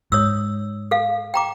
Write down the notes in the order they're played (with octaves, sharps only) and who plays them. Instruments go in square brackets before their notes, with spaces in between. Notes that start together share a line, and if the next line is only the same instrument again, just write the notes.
[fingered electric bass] G#2 [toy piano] C#5 D#6 E6
[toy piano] A4 F5
G5 A#5 D6